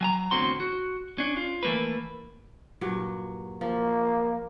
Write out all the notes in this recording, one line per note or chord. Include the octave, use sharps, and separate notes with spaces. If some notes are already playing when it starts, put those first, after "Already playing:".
F#3 G#5 A#5
E2 A2 D3 C4 F#4 C6
F#4
C#4 D4
F4
E3 A3 A#3 A#4 B4
G2 A#2 F#3
F3 A#3